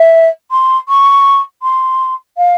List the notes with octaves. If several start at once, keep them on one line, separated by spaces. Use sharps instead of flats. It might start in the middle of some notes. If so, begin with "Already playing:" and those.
Already playing: E5
C6
C#6
C6
F5